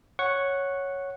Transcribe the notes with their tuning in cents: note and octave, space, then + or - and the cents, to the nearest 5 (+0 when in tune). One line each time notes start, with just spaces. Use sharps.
C#5 +0 F#5 +0 C#6 -5